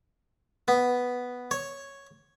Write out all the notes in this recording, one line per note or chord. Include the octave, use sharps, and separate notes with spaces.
B3
C#5